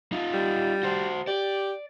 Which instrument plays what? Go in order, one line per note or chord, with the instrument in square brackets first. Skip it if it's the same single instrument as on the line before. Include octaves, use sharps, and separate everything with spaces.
[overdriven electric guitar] D#4 F4
[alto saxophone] G3
[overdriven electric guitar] F#4 C5
[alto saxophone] G4 [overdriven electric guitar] D5